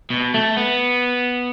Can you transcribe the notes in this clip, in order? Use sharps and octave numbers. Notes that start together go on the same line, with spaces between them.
B2
A3
B3